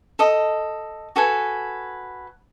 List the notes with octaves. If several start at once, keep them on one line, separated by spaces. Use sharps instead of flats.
A4 D#5
F#4 A4 B4 G#5